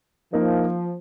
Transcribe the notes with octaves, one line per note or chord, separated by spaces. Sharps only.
F3 A#3 D#4 A#4